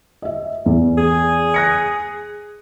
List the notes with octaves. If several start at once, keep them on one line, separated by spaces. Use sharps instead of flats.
D#5 E5
E2
G#4
F#6 A#6 C#7